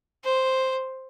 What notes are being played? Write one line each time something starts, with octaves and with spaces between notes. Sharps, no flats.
C5